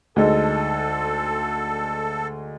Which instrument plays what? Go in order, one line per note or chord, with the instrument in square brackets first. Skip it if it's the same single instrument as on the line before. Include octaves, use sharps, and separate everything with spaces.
[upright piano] D2 G#3 D#4 [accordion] A4